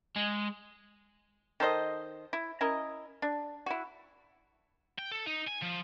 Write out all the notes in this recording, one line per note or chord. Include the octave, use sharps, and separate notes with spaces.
G#3
D#3 A4 C5 D#5
E4
C#4 E4 A#4 D#5
D4
E4 F#4
G5
A4
D#4
G#5
F3